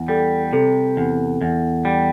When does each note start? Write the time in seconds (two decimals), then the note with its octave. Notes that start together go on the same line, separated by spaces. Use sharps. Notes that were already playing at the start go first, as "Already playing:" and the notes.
Already playing: E2
0.08 G3 A4
0.53 C3 A4
0.97 E2
1.41 E2
1.85 G3